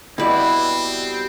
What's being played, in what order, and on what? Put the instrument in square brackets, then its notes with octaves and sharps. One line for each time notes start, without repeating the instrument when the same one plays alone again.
[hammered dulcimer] B2 G3 [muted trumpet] C4 [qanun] E4 B4 D5